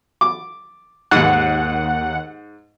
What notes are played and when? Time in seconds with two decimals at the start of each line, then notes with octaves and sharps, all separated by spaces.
0.21 D6
1.11 D#2 G#2 F#5